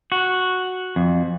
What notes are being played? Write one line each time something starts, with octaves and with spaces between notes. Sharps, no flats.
F#4
F2